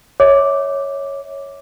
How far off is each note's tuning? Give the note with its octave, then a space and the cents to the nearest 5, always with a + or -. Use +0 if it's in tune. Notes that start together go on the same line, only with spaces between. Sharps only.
C#5 +0 E5 -30 D6 +0